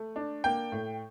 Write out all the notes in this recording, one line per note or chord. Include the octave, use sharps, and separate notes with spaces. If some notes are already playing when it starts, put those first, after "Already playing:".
Already playing: A3
D4
A#3 G5
A2